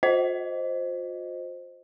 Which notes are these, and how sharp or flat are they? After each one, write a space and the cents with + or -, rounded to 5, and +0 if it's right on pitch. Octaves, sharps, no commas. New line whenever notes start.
F4 +45 C5 +0 D#5 +0